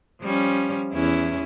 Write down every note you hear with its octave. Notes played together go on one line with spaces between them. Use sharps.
F3 G3 C#4
E2 C#4 E4